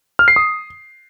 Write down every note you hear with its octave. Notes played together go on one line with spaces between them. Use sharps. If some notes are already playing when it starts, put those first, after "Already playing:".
F6
C7
D#6